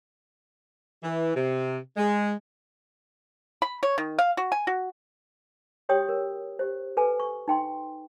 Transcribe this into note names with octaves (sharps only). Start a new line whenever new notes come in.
E3
C3
G#3
B5
C#5
D#3
F5
F#4
G#5
F#4
F#4 G4 C#5 G5 D#6
A#4
G4 C5
A4 B4 G#5
C#6
D#4 G5 C6